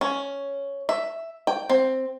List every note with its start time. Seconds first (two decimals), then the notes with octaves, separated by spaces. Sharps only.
0.01 C#4
0.89 E5
1.47 G5
1.70 C4